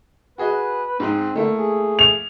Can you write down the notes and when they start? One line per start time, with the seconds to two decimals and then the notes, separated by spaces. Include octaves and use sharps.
0.38 F#4 G#4 B4 D#5
1.00 G#2 C4 D#4
1.36 D3 A3 A#3 E4
1.56 G#4
1.99 F7